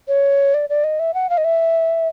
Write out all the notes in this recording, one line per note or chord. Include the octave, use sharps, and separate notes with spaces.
C#5
D5
D5
D#5
E5
F#5
F5
D#5
E5